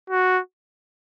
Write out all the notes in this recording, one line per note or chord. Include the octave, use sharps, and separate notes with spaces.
F#4